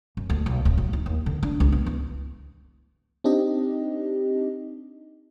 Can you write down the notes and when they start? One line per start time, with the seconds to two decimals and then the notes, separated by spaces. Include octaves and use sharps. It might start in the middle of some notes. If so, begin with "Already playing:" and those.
0.17 F#2
0.30 D2
0.46 B1
0.65 D1
0.78 F#3
0.93 D#4
1.06 D#2
1.26 D3
1.43 D4
1.60 C#2
1.72 B3
1.86 E3
3.24 C4 D4 D#4 G4 D#5